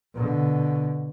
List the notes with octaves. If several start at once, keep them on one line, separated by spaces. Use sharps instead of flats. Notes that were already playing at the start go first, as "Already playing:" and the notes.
B2 D3